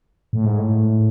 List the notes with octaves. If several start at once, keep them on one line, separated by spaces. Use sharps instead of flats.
A2
G#2
A2